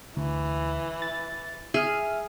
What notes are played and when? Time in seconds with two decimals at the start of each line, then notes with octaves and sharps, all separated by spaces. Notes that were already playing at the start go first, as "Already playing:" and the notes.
0.17 D2 E3
1.02 A6
1.74 G#4 E5 F6